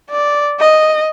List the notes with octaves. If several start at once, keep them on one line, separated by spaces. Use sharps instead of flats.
D5
D#5